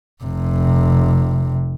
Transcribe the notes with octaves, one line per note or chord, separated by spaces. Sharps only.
F1 C3